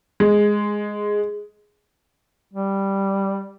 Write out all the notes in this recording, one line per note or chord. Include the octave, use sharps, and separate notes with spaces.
G#3
G3